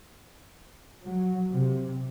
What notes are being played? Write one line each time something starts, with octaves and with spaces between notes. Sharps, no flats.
F#3
C3